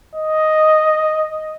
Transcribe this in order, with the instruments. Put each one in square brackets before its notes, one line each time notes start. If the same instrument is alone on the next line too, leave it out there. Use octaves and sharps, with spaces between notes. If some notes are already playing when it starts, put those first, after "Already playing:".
[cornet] D#5